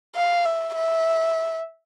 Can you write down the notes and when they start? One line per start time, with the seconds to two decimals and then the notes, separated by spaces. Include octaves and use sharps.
0.15 F5
0.45 E5
0.75 E5